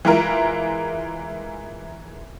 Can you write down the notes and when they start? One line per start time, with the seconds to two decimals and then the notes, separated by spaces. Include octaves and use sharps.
0.05 E3 G#3 E4 F4 A#4